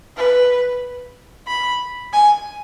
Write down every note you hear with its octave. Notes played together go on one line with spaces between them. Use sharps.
B4
B5
G#5